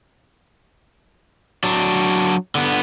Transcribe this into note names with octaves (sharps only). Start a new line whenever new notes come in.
F#3 D4
D3 B3